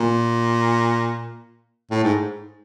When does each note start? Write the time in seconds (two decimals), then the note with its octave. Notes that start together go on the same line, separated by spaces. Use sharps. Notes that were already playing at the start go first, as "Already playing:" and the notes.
Already playing: A#2
1.91 A2
2.04 G#2